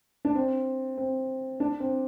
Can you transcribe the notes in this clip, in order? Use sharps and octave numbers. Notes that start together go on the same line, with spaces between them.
D4
C4
C4
D4
C4